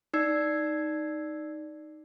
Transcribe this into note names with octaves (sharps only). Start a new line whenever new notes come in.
D#4 D5 E6 G#6 C7